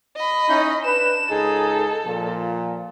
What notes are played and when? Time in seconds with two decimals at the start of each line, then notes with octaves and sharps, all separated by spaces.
0.17 D#5 B5
0.49 C#4 D#4 E4
0.85 D4 B4 E7
1.29 C#2 D#4 G#4 A4
2.06 A#2 F3